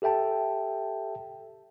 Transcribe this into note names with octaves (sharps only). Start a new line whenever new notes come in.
G4 A4 E5 G5 A5